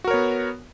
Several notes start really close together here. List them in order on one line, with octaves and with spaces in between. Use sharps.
F#4 A#4 C#5 B3